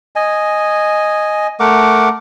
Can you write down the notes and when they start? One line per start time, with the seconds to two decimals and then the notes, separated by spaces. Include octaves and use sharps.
0.16 D#5 G#5
1.60 A3 A#4 F#5 D6